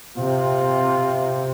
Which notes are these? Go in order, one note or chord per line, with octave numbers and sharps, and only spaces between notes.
C3 F4